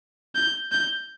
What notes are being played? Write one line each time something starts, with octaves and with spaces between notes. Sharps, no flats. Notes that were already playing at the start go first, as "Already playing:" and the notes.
G6
G6